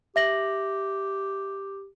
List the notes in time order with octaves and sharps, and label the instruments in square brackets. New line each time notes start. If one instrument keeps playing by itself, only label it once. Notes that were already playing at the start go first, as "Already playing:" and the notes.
[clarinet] G4 [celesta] E5 A#6 F#7